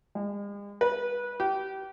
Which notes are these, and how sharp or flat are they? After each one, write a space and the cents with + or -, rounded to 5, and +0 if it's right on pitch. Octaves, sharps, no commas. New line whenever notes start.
G#3 -45
B4 -20
G4 -25